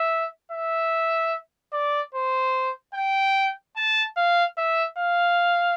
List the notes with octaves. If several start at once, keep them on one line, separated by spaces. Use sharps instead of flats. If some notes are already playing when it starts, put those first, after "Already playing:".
Already playing: E5
E5
D5
C5
G5
A5
F5
E5
F5